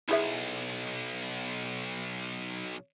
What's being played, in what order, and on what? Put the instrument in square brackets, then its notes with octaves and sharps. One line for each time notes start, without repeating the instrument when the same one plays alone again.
[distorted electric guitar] B1 [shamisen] E4 G#4 E5